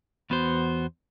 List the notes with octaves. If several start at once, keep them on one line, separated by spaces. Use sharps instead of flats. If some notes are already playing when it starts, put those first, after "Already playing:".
E2 B3 F#4 C5